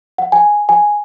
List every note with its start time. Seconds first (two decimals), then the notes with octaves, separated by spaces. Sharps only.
0.18 F#5
0.32 G#5
0.69 G#5